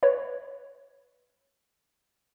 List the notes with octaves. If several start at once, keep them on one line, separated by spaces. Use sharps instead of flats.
B4 C#5